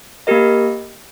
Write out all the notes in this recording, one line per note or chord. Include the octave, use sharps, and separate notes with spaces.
A#3 G4 A#4 D#5